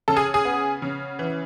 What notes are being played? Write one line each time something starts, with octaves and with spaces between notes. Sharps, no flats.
C#3 A4
G#4
G#4
B3
C#3
E3